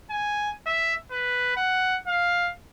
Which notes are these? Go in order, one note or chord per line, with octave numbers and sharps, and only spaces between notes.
G#5
E5
B4
F#5
F5